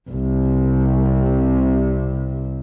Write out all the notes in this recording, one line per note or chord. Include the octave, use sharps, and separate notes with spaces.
C2 C3